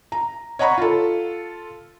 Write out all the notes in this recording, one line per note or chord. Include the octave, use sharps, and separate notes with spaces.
A#5
C#5 D#5 F#5 A#5 B5 C#6
F4 A4